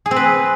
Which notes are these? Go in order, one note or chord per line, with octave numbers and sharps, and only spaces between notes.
G#4
C4
B4